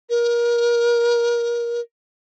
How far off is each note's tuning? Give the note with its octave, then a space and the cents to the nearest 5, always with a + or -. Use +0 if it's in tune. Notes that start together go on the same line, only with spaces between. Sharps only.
A#4 +25